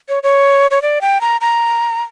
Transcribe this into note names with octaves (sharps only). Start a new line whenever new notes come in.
C#5
C#5
C#5
D5
G5
A#5
A#5